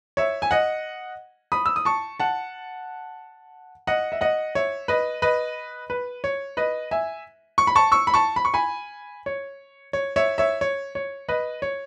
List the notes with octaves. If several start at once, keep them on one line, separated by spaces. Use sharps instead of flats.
C#5 E5
G#5
D#5 F#5
B5 D#6
E6
D#6
A5 C#6
F#5 A5
D#5 F#5
E5
D#5 F#5
C#5 E5
B4 D#5
B4 D#5
B4
C#5
B4 D#5
E5 G#5
C#6
B5
A5 C#6
C#6 E6
B5
A5 C#6
B5
C#6
G#5 B5
C#5
C#5
C#5 E5
C#5 E5
C#5
C#5
B4 D#5
C#5